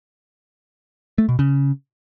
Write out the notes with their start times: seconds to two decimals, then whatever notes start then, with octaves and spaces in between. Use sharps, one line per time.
1.18 A3
1.29 B2
1.39 C#3